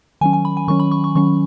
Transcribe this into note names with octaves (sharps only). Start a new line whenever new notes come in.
D#3 F#3 C#4 G#5
G#5
B5
G#5
D#3 F#3 C#4 C#6
B5
C#6
C#6
D#3 F#3 C#4 C#6